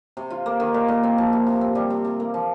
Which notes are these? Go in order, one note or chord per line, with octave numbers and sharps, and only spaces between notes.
C3
F4
A#3
D#3
A#2
A#2
C4
F3
C3
C3
C4
G3
C3
C3
A#3
F3